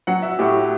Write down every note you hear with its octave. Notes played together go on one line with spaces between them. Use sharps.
F#3 F#5
E5
A2 G4